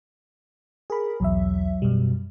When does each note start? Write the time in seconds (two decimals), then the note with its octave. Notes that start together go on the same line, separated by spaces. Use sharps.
0.90 G#4 A#4 B5
1.20 B1 E2 F#3 E5
1.82 F#2 B2 G3